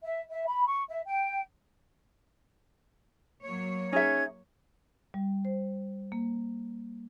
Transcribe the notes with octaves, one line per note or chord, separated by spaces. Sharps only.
E5
E5
B5
C#6
E5
G5
F#3 A#3 C#5
C#4 D#4 G#4 E5 G#6
G3
C5
A#3